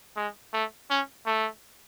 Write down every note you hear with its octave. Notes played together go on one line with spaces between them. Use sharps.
G#3
A3
C#4
A3